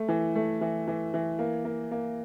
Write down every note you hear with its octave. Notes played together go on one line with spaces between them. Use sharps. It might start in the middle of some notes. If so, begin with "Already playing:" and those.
Already playing: A3
E3
A3
E3
E3
E3
A#3
A#3
A#3